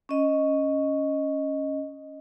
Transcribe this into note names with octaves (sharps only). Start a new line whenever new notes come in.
C#4 D#5